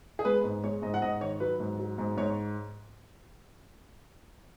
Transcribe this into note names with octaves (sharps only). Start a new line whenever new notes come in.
G#4
G#3 B4
G#2
G#3 C#5
G#2 D#5
F#5
G#2 D#5
D#3 C#5
F#3 B4
G#2
F#3
G#2
G#2 C#5